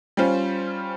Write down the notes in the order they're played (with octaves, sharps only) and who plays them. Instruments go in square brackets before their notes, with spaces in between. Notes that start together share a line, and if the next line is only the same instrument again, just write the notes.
[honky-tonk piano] G3 C#4 F4 C5